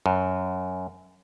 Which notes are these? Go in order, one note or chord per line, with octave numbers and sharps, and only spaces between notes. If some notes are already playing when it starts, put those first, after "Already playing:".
F#2